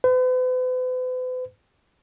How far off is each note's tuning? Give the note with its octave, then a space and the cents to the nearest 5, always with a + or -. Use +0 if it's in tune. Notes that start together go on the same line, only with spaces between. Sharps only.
B4 +45